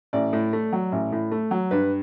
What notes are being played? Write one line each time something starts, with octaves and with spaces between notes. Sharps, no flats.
A1 D5
A2
A3
F#3
A1
A2
A3
F#3
G2 B4